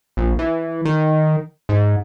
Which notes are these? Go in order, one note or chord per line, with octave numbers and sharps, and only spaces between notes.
A#1
E3
D#3
G#2